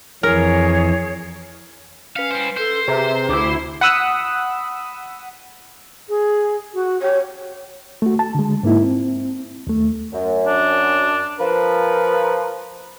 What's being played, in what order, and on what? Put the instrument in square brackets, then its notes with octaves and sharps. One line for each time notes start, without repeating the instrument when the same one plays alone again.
[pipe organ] F2 E3 [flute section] G#4 C#5 [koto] A#4
[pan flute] C#4 [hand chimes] B4 B6 C#7 [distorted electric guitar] F5
[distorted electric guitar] G3 C5
[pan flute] A4 [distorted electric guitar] C5
[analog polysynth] C3 [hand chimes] G#4 B4 A#5 [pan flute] E5
[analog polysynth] D2 E4 [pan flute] D6
[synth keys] F#5 B5 D#6 E6 F#6
[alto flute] G#4
F#4
[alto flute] G4 [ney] C#5
[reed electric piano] A3 F#4
A5
D3 G#3
G#2 A#3 D#4 E4
C4
D#2 A3
[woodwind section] F#2
[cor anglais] D4
[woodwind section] F3 A#4 [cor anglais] B4